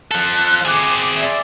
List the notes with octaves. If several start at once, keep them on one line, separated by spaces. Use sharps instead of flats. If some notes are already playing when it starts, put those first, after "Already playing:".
F3 A4 F#6
C4 G#4 D6
D5 E5